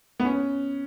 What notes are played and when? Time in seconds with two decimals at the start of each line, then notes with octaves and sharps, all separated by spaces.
0.20 B3
0.25 C#4